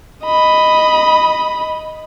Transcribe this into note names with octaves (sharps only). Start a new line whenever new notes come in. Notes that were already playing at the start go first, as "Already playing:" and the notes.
D#5 B5